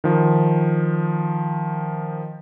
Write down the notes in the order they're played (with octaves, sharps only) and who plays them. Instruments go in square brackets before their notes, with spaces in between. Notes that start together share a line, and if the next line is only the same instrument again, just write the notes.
[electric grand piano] D#3 F3